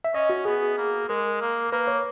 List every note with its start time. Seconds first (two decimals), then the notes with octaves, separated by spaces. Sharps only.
0.05 E5
0.14 C#4 D#5
0.30 F#4
0.45 B3 G#4
0.77 A#3
1.09 G#3 A#4
1.41 A#3
1.72 A#3 B4
1.87 C#5